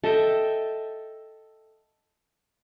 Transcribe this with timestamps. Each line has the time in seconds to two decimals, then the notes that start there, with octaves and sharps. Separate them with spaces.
0.04 A4 D#5 E5 G5